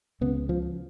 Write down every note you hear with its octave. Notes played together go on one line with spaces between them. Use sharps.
C#2 C#3 B3
F3